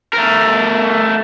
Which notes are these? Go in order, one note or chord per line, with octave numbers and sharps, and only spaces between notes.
A3 A#4